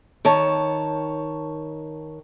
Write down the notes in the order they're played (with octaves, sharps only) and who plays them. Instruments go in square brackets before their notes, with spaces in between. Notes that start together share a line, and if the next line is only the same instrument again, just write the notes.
[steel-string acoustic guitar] D#3 C#5 A5